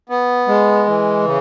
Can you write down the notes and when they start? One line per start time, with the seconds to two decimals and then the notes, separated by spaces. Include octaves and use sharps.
0.09 B3
0.48 G#3
0.86 E3
1.25 C#3